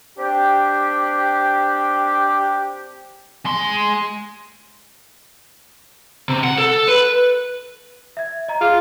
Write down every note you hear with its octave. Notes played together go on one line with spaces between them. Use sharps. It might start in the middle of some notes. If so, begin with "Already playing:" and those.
C4 D4 G4
G#3 C6
C3
F#5
A4
B4
E5 G#6
D#5 A#5
F4 G#4